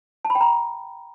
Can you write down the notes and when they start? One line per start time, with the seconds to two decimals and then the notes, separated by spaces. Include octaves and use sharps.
0.25 A5
0.30 B5
0.35 G5
0.41 A#5